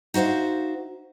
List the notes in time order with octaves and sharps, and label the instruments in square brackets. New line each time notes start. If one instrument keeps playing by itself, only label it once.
[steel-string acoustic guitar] D#4 F#4 C5 E5 F5